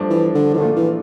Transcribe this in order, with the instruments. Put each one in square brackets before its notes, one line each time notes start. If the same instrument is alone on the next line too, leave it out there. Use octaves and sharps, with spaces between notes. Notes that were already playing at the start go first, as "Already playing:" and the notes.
Already playing: [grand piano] G2 F3 A3 D4
[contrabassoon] E3
D3
E3
[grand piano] A#1 A#2 A3 D4 F4 [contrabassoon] D3
[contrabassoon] E3